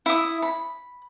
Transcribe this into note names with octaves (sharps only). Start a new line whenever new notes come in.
E4 D#6
B5